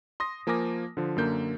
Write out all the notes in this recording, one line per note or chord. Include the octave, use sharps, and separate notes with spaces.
C6 D#6 A#6
F3 A#3 A#4 G#5 D6 A#6
D3 F3
F#2 D3 A#3 G6